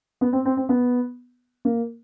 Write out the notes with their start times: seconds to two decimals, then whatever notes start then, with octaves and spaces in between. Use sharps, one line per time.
0.21 B3
0.33 C4
0.45 C4
0.57 C4
0.69 B3
1.65 A#3